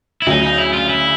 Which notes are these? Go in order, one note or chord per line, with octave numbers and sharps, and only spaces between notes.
E4
D2 C#3 F#3 D#4
D#4
E4
F4
E4